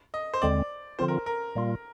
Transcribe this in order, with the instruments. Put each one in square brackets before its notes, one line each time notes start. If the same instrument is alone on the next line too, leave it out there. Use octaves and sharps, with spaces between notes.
[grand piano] D#5
C5
[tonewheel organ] D#2 D3 G#3 C4 [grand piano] D5
[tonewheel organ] D3 F3 C4 F4 [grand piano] C5
[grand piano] A#4
A#4
[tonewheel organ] A#2 G3 A#3 F4